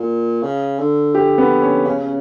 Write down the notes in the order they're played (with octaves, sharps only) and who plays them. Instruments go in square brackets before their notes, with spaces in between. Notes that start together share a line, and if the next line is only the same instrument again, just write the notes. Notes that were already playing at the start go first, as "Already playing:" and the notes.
Already playing: [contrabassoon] A#2
C#3
D3
[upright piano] G4
B3
C#4
[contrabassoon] C#3 [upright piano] C#4